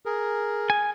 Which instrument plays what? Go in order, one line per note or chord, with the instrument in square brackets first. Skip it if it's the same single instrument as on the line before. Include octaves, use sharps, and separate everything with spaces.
[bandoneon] G#4 A#4
[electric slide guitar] G#5